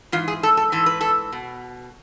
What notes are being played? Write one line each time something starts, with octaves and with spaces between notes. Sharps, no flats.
G#2 E3 F4
G#4
A4
A4
G#2 E3 A4
B4
A4
B2